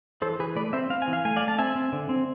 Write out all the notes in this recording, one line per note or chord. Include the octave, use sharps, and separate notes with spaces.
E3 A4 C5
E3 G#4 B4
A3 B4 D5
C4 C5 E5
C4 F5
G#5
E3
F5
A3 G#5
D5 F5
A3
A5
C4 E5 G#5
C4
D3
C4